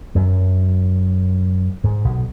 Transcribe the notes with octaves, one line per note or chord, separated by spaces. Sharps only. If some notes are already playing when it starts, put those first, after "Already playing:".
F#2 F#3
G#2 G#3
B1 B2